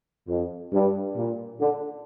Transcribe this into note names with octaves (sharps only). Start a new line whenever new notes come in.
F2
G2
A#2
D3